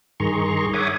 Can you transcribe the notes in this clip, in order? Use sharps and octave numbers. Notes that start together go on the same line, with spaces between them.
G2 D#3 G#4 A#5 C6 C#6
C#5 E5 F#5 G#5 D6 D#6